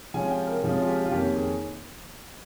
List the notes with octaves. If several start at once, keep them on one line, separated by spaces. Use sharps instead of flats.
C3 F3 G#3 C#4 G#5
G5
A#4
C3 F3 G#3 C#4 G#4
F4
G4
F4
F2 D#3 A#3 C#4 G4
G#4